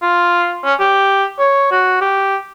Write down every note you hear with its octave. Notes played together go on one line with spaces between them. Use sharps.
F4
C#4
G4
C#5
F#4
G4